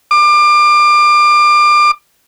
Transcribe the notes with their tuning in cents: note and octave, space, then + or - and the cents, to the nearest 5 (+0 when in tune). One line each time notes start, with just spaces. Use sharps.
D6 +30